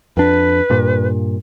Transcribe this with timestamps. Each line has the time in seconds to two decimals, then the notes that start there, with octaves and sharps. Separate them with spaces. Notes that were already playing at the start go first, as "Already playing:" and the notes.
0.17 F2 D4 B4
0.70 G2 A#2